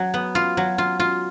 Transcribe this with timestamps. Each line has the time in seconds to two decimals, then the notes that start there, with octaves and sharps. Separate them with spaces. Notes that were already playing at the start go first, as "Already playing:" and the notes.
Already playing: F#3
0.14 B3
0.35 F4
0.57 F#3
0.78 F4
1.00 F4